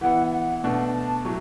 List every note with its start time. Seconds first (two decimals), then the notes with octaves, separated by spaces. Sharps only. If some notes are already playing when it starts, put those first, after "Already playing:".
0.01 E3 B3 E4 F#5
0.32 F#5
0.63 B2 A3 D4 F#5
0.94 A5
1.24 A2 F#3 C#6